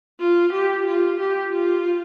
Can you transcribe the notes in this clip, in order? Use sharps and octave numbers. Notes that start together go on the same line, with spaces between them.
F4
G4
F4
G4
F4